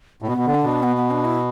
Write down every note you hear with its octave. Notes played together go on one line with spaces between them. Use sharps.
A2
B2 B3
B2
D3
D4
B2
B3
B3
D4
E4